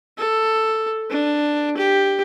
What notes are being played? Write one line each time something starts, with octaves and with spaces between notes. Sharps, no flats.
A4
D4
G4